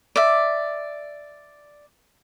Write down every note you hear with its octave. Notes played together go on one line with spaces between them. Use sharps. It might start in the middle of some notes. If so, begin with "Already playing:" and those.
D5 E5